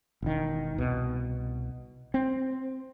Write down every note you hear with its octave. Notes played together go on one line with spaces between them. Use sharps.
E1 D#3
C2 B2
C4